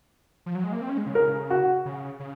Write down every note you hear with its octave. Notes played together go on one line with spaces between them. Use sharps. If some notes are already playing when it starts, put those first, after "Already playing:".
F3
F#3
G#3
A#3
C4
C#4
G#3
C#3
A#4
F#4
C#3
C#3